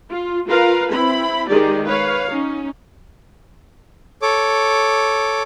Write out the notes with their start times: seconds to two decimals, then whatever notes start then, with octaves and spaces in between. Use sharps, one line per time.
0.10 F4
0.48 F4 A#4 B4 F5
0.93 C4 E4 B5
1.50 D#3 G#3 G4 G#4 D5
1.87 B4 C#5 F5
2.31 C#4 D#4
4.22 A4 C#5 D6